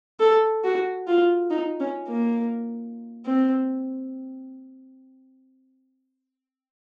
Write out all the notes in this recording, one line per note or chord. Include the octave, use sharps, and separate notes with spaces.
A4
F#4
F4
D#4
C#4
A#3
C4